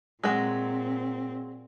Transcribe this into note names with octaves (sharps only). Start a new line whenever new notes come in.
A#2 F#3 G#3 C4